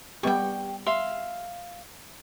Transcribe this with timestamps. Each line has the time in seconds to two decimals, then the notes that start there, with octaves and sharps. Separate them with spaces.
0.23 G3 B3 G4 G5 C#6
0.86 E5 F5 C6